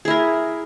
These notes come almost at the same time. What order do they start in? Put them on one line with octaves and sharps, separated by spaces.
G#4 E4 A#4